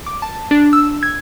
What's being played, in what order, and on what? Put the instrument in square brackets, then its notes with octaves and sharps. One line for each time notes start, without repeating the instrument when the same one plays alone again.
[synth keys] D6
A5
D4
E6
G#6